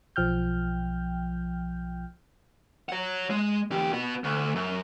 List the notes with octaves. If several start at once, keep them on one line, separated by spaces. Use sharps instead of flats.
B1 F3 G5 F6 G6
C#5 F#5
G#3
E2 G4
B3 F#4
D2
F#2